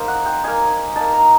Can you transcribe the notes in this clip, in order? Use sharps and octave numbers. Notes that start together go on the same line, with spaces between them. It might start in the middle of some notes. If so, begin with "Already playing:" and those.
Already playing: A#3 D#4 C5
F#5
G5
A#3 D#4 G#5
A#3 D#4 A5
A#5